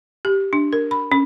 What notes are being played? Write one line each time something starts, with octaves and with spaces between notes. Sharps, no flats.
G4
D4
A#4
B5
C#4